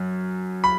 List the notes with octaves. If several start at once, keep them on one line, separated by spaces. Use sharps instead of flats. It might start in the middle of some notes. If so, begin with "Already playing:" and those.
Already playing: F#2
B5